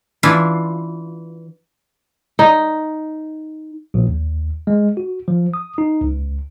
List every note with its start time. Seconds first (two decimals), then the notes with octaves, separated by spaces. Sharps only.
0.23 E3 D4 E4 F4
2.39 D#4
3.94 A#1
4.08 D#2
4.67 G#3
4.97 F#4
5.28 F3
5.54 D#6
5.78 D#4
6.01 C#2